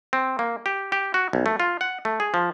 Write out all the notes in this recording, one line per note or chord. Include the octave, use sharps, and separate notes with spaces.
C4
A#3
G4
G4
F#4
B1
A3
F4
F#5
A3
G#4
F3